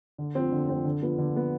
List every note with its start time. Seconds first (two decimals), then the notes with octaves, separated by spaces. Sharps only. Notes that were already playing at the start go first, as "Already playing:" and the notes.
0.18 D3
0.35 F3 C4
0.52 D3
0.69 F3 C4
0.85 D3
1.02 F3 B3
1.18 D3
1.35 F3 B3